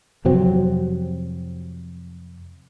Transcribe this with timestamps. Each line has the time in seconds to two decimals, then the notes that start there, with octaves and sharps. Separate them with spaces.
0.25 F2 C3 F#3 C4